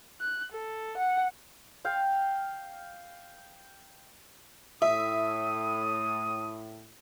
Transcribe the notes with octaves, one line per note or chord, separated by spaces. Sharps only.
F#6
A4
F#5
F5 G5
A2 E5 D#6